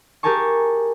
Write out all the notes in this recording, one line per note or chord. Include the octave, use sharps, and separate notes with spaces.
G4 G#4 A#4 G#5 A5 C#6